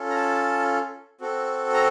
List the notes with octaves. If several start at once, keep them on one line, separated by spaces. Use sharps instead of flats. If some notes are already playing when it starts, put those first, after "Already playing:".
Already playing: C#4 F4 A4
A#5
A5
C4 F#4 A4
A#5